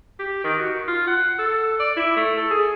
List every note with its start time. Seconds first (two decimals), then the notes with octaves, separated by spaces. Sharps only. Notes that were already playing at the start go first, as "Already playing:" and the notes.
0.19 G4
0.44 D#3
0.58 F#4
0.88 F4
1.07 F#5
1.39 A4
1.79 D5
1.97 E4
2.16 A3
2.37 A4
2.51 G#4